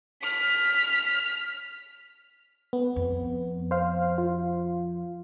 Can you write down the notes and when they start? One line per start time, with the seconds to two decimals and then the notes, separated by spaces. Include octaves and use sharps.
0.22 F6 B6
2.73 B3
2.96 F2
3.71 C5 F5
4.18 F4